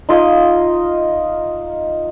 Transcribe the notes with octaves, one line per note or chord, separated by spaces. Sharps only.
D#4 F4 D#5 D#6